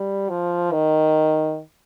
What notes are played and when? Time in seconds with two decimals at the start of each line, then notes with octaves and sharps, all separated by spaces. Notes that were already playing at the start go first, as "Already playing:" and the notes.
Already playing: G3
0.30 F3
0.72 D#3